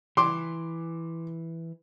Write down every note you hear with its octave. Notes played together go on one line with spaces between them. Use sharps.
E3 C6 D6